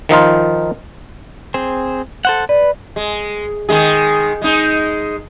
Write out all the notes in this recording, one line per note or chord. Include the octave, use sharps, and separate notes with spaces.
D#3 F3 D#4 F4
C4 G#4 C5
A4 C5 F#5
B4 D5
G#3
D#3 G#3 G#4
G#3 D#4